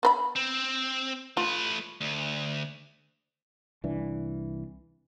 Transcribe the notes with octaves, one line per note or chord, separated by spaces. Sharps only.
B3 B4 B5
C4
A3 F4 B4
D2
C2 E3 D4